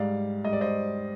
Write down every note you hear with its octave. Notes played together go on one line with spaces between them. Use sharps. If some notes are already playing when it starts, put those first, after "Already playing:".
Already playing: G#2 G3 D5 F5
G#2 G3 D#5
D5
C5 D#5